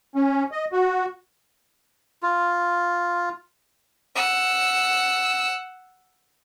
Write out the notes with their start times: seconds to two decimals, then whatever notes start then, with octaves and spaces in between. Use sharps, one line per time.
0.15 C#4
0.51 D#5
0.72 F#4
2.23 F4
4.15 F#5 E6